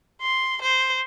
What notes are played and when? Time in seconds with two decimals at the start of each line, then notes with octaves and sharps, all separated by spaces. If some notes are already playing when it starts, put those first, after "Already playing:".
0.22 C6
0.62 C5